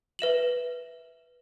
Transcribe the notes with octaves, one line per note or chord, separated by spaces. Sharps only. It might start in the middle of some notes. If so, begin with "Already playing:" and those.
B4 E5 E7 F#7